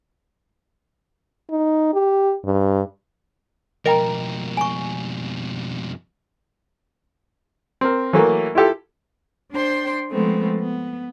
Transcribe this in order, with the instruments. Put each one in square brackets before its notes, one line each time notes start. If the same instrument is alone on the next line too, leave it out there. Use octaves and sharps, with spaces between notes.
[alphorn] D#4
G4
G2
[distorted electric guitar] F2 B2 [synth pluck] A#4 [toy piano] D#5 G5 A#5
[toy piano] G#5 C#6
[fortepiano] C4 A#4
E3 F#3 A3 A#3
E4 F4 G4 A4
[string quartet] D4 C5 G5 C6
F3 G#3 A3 B3 C4
B3